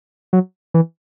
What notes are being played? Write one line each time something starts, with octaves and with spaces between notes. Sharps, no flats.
F#3
E3